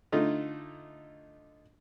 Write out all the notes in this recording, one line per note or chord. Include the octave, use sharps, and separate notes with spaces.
D3 A3 D#4 F4